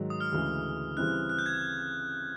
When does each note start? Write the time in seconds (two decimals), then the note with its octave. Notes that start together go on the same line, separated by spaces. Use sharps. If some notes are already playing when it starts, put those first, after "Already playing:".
Already playing: G#2 D#3 F#3
0.10 D#6
0.21 F6
0.32 D2 C#3 E3 G#3
0.97 C#3 E3 G3 C4 E4 F#6
1.30 F#6
1.39 G6
1.46 G#6